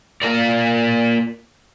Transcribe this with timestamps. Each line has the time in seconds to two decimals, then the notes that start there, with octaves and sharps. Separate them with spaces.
0.22 A#3 F4 A#4 D5